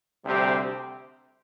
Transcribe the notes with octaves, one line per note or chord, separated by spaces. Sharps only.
D2 C3 G3 C4 G4